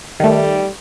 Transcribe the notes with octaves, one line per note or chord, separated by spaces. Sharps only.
D#3 G3 A3